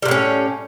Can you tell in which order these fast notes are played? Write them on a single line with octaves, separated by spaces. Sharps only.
G3 C3 A2 C#4